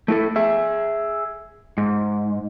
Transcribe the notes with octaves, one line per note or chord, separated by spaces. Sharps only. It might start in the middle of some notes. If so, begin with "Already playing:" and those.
A3 E4 A4
G#4 E5
G#2